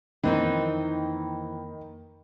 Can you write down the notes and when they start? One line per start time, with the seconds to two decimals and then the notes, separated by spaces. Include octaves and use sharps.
0.23 F2 D#3 E3 A#3 C4 D#4 B5